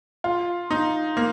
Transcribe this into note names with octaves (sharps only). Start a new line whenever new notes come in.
F4
D#4
A#3